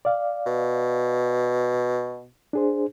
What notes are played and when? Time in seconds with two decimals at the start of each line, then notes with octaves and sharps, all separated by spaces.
0.05 D5 F5
0.46 B2
2.53 D4 G#4 C5